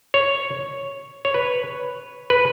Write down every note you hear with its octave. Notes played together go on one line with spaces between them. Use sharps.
C#5
C#5
B4
B4